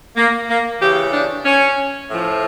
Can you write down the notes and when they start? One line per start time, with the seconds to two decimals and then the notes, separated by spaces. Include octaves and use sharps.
0.16 A#3
0.49 A#3
0.81 C#3 E3 G4
1.13 D4
1.46 C#4
2.10 A2 F3